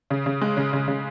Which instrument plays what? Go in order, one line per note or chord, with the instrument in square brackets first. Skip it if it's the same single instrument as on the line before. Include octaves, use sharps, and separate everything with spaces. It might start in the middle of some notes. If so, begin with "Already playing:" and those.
[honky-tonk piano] C#3
C#3
G#3
C#3
C#3
C#3